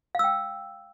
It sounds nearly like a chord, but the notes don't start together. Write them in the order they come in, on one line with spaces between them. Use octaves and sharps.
F5 E6 G5